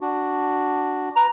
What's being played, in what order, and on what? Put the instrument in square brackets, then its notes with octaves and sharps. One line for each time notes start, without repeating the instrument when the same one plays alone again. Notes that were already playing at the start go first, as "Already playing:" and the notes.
[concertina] D4 F#4
[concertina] B4 [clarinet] A#5